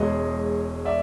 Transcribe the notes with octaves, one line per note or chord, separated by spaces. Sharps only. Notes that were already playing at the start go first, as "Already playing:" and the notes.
Already playing: E1 E2 B2 G#3 C#5 D#5
D5 E5